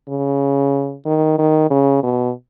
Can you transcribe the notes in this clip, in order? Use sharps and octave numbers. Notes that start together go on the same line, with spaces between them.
C#3
D#3
D#3
C#3
B2